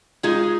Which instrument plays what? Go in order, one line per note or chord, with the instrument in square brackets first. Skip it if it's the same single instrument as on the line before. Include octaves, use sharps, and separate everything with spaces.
[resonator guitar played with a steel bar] G#3 D#4 G#4 [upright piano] F4